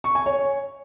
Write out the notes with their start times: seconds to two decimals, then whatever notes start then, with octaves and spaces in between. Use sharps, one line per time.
0.04 C#6
0.15 G#5
0.26 C#5